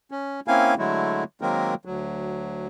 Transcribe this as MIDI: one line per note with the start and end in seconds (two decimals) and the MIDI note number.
0.11 0.40 61
0.48 0.75 58
0.48 0.75 60
0.48 0.75 61
0.48 0.75 64
0.48 0.75 77
0.48 0.75 80
0.78 1.24 50
0.78 1.24 54
0.78 1.24 56
0.78 1.24 57
0.78 1.24 64
1.41 1.74 51
1.41 1.74 54
1.41 1.74 56
1.41 1.74 58
1.41 1.74 60
1.41 1.74 70
1.85 2.68 38
1.85 2.68 54